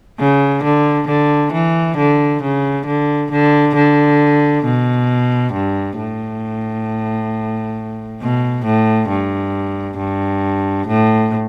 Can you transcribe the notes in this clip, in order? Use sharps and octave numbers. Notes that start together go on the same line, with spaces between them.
C#3
D3
D3
E3
D3
C#3
D3
D3
D3
B2
G2
A2
B2
A2
G2
G2
A2